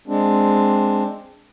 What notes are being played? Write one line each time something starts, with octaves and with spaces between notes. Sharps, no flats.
G#3 C4 D4